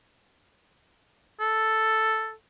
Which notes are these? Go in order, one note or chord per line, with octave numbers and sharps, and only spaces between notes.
A4